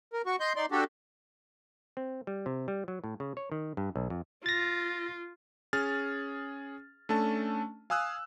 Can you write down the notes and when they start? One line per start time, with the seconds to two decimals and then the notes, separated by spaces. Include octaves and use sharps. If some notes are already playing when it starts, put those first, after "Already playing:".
0.13 A#4
0.26 F#4 C#6
0.40 D#5 C6 G6
0.56 D#4 D5 C6
0.71 D4 F#4 G4 A4
1.97 C4
2.27 G3
2.46 C3
2.68 G3
2.88 F#3
3.04 A2
3.20 C#3
3.37 C#5
3.52 D#3
3.77 G2
3.96 B1
4.10 F2
4.46 F4 A6 A#6
5.73 C#4 G#4 F6 A6
7.09 A3 C#4 D4 A4 A5
7.90 F5 G#5 D#6 E6 F#6